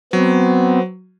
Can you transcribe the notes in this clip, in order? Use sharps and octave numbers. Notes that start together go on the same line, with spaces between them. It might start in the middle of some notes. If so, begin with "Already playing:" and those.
F#3 B3 C4